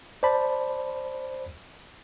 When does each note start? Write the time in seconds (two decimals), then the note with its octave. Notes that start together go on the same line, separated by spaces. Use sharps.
0.23 C5 D5 A5 B5